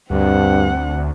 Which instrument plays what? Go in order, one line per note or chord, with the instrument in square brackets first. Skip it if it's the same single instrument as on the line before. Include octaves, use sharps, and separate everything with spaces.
[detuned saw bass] D2 [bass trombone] G2 [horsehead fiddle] C4 F#5